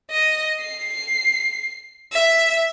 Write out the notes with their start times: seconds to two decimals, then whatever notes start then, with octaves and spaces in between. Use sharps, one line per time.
0.11 D#5
0.61 C7
2.12 E5